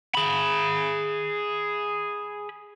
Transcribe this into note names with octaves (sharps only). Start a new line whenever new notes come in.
G#4 B5